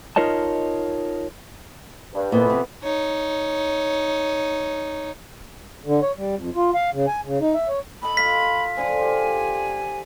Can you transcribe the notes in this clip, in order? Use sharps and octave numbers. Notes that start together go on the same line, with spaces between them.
D#4 F4 A#4 C#5 D#5 A5
G2
F2 A#2 E3 B3
C3
D#4 C#5
D3
C#5
G3
F2
F4
F5
C#3
G#5
C#3
D#4
E5
C#5
A4 D#5 A5 B5
F4 F5 B6
D3 F3 G#5
F4 G4